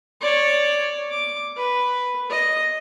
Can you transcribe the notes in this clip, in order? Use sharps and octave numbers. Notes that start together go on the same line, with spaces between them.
C#5 D5
D6
B4
D#5